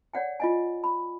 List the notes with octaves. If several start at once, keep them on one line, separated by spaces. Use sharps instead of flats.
C#5 D5 F#5 G5
F4 D#5 G#5
B5